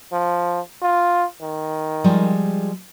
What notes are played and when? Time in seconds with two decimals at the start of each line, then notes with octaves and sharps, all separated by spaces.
0.12 F3
0.82 F4
1.42 D#3
2.04 F3 G3 G#3